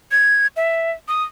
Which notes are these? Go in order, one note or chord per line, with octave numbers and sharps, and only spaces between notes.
G#6
E5
D#6